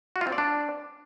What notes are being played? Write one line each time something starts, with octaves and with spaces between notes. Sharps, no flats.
F#4
F4
C4
D5
D4